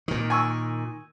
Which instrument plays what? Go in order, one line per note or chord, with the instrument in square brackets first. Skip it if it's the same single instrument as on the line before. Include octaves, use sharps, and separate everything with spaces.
[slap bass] A#2 D#3
[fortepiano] G#5 C#6 E6